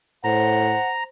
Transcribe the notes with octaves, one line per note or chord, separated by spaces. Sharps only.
A2 C5 F#5 A#5